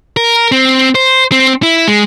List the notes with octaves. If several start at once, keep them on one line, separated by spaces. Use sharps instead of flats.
A#4
C4
C5
C4
E4
G#3